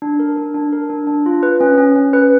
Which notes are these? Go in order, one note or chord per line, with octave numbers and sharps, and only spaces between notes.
D4
A#4
D4
D4
A#4
D4
D4
F4
B4
C#4
C#4
C#4
B4